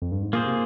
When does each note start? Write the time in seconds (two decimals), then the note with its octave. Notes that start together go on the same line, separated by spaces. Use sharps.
0.02 F2
0.12 G2
0.22 G#2
0.33 A#2 A#3 F4 G#4 C5
0.46 C3